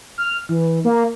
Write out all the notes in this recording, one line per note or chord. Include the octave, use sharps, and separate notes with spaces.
F6
E3
A#3